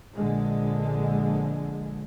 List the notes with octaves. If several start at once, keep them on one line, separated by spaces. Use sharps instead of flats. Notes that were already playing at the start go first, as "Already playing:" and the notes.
A#1 D3 G#3